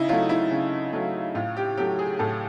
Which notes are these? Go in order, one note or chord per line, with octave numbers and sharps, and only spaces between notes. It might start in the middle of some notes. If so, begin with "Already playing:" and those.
Already playing: C#3 D#4 E4
F#3 A3 F4
E4
C#3
F#3 A3
A2 F4
G4
F#3 A3 G4
G#4
A2 A4